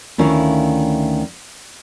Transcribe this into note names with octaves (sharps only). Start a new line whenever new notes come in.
D2 D#3 C#4 E4 F5